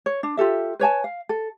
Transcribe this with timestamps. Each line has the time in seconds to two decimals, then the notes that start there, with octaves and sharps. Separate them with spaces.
0.06 C#5
0.23 D4
0.37 F4 G4 A4 E5
0.79 B4 C#5 G#5 A5
1.04 F5
1.29 A4